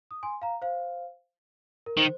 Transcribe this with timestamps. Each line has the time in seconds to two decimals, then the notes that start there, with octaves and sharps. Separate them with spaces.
0.11 D#6
0.23 G#5 C6
0.42 F5 A#5
0.62 C5 F5
1.86 A#4
1.97 D#3 C5